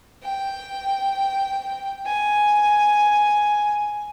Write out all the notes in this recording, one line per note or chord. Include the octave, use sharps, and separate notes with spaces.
G5
G#5